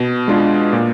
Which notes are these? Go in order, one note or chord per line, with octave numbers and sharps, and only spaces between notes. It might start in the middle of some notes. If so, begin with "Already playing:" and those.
Already playing: B2
G#3 D4 F4 G#4
A#2